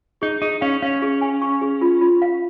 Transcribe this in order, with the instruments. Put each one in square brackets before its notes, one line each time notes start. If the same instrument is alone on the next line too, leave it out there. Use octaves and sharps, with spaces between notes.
[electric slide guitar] D#4 [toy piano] G#4
[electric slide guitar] D#4 [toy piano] G#4
[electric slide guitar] C#4 [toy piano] F5
[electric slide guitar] C#4 [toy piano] F5
[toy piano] G#4
G#5
C#6
G#4
F4
F4
F5